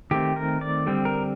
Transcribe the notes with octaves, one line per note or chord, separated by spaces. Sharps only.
D#3 A3 C4 G4
A#4
D5
D3 G3 C4
A#4